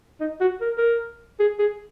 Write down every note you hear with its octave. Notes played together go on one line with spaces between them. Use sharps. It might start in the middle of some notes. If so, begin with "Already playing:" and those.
D#4
F#4
A#4
A#4
G#4
G#4